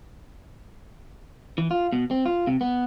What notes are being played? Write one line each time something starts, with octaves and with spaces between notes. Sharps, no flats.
E3
F4
B2
C4
F4
C3
B3